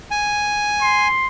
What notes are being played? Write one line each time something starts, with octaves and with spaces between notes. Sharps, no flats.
G#5
C6